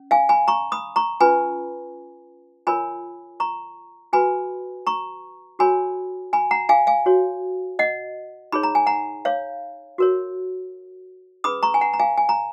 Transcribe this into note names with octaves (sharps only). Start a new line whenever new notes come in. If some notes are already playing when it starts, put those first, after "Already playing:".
Already playing: C#4
F5 G#5
G#5 B5
A#5 C#6
B5 D#6
A#5 C#6
C#4 F4 B4 G#5 B5
F4 A#4 C#5 G#5 B5
A#5 C#6
F#4 B4 G#5 B5
A#5 C#6
F#4 A#4 C#5 G#5 B5
G#5 B5
F#5 A#5
F5 G#5
F5 G#5
F#4 C#5
D#5 F#5
D#4 G#4 C#5 B5
A#5
G#5
F#5 A#5
C#5 F5
F#4 A#4 C#5
C#4 G#4 B4 B5 D#6
A#5 C#6
G#5
F#5 A#5
A#5
F5 G#5
G#5
A#5